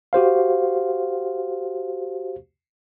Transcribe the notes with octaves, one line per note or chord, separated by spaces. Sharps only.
F#4 G4 C5 F5